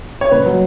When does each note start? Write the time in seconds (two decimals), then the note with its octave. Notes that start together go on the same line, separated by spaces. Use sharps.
0.21 C#5
0.31 F#1 B4
0.46 F#3